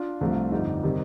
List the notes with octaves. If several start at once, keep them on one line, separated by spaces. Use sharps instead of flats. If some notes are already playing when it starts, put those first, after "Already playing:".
Already playing: D4 F4
C2 C3 F3 A3
G1 F2 D3 D#4 G4
C3 D#3 G3